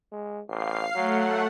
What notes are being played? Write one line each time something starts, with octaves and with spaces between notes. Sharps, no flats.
G#3
A1 F5 C7
F#3 A3 F#5